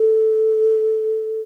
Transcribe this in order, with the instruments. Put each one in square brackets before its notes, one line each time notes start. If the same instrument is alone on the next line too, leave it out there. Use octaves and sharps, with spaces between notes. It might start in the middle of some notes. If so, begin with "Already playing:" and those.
Already playing: [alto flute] A4